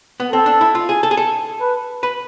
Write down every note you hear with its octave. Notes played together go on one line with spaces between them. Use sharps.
B3
C4 A4
D4
E4
F4
G#4
A4
G#4
A4
B4
B4